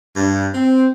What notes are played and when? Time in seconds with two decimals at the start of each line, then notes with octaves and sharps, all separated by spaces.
0.16 G2
0.54 C4